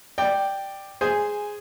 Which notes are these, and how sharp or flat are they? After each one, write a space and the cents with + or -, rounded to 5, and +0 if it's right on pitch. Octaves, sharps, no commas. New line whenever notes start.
D5 +10 G5 +0
G#4 +0 C5 -5 G#5 -10